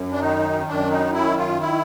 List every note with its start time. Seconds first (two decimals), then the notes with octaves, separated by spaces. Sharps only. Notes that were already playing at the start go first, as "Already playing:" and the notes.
Already playing: F#2
0.12 D4
0.21 D#3 D#4
0.67 F#2 D4
0.90 D#4
1.13 D#3 E4
1.37 F4
1.61 E4